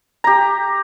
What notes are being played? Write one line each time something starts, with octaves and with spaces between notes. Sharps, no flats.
G4 A#5